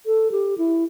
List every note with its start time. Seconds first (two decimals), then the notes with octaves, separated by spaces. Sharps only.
0.06 A4
0.32 G4
0.58 E4